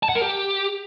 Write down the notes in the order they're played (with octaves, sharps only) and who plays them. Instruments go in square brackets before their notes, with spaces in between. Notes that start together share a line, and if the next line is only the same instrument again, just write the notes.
[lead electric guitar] A5
F#5
A#4
G4